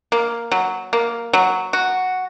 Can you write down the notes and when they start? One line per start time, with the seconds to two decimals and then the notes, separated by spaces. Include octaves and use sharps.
0.12 A#3
0.51 F#3
0.93 A#3
1.33 F#3
1.73 F#4